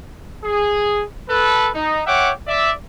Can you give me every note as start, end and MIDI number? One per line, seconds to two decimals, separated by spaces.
0.44 1.03 68
1.29 1.69 69
1.29 1.69 71
1.74 2.01 63
2.06 2.31 73
2.06 2.31 76
2.06 2.31 78
2.06 2.31 79
2.06 2.31 86
2.47 2.71 74
2.47 2.71 76